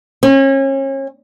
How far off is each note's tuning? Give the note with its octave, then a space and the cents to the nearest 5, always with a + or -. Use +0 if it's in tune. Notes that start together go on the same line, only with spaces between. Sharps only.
C#4 -35